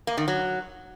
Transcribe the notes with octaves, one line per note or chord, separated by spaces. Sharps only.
A#3
D#3
F#3